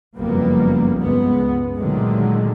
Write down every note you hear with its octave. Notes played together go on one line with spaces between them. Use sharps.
F#1 F2 G3 A#3 B3
C#2 G2 G#3 B3
A#2 D3 D#3 F#3 G#3 A3